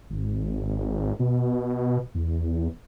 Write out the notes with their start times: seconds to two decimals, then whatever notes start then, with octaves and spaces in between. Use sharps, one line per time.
0.10 G#1
1.19 B2
2.15 E2